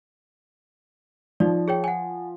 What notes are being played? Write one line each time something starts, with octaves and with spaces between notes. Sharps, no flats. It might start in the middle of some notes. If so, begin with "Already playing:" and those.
F3 D#4 D5
G#4 C#5 G5
F#5 G#5